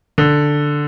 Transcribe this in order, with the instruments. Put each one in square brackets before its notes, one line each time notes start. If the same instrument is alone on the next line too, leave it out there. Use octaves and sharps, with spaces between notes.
[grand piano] D3